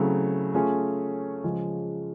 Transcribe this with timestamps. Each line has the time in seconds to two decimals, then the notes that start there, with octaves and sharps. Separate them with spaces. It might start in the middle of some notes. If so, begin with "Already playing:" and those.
Already playing: C#3 F#3 A3 C4 E4
0.54 A3 C#4 F4 G#4 C#5
1.44 C#3 F3 G#3